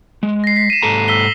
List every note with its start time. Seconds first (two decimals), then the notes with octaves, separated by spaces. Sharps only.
0.23 G#3
0.44 A#6 C7
0.56 B6 C7
0.70 D#7 E7
0.82 G#2 A4 A#5
1.08 E6 B6 G7